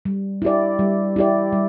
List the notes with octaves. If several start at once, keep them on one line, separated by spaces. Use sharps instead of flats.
G3
E4 G4 D5
G3
E4 G4 D5
G3